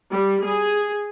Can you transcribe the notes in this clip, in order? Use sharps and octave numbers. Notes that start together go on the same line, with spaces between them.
G3
G#4